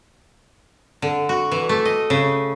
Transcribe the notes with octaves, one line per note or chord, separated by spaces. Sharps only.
D3
F#4
E3
A3
D#5
C#3